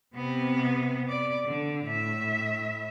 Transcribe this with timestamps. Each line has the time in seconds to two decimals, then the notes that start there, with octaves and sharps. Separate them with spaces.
0.15 C3 B3
1.09 D5
1.45 D3
1.86 A2 E5